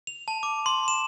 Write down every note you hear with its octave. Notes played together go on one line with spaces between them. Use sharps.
F7
A5
D6
C6
E7